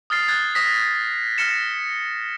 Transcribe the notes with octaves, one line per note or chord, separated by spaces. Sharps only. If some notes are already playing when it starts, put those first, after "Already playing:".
D#6 F6 A6 C7
F#6 G#6 A6
D#6 A#6 B6
F6 A#6 C#7 E7